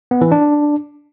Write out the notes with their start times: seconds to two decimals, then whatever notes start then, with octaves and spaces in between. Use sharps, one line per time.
0.11 B3
0.21 E3
0.32 D4